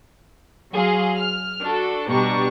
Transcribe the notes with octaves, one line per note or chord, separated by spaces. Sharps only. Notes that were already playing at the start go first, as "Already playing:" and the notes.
F#3 G#4 F5 C6
F6
D4 F#4 A4
B2 G3 D4 A#5 C#6